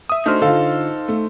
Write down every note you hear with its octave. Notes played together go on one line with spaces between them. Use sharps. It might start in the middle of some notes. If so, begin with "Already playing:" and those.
E5 D#6
A3 D4 D#4 F#4 C5 F6
D3 F4 A4 F5
A3